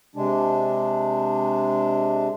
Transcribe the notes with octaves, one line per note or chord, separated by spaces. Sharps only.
C3 G#3 D4